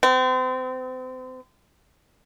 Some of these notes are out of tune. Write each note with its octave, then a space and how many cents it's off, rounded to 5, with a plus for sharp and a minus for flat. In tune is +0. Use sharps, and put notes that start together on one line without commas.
C4 -35